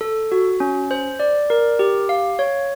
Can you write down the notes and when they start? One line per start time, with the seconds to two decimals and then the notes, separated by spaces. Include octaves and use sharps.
0.01 A4
0.32 F#4
0.60 C#4
0.91 C5
1.20 D5
1.50 A#4
1.79 G4
2.09 F5
2.39 C#5